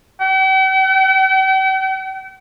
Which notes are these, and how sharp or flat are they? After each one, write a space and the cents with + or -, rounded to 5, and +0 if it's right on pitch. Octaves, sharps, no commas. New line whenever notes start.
G5 -45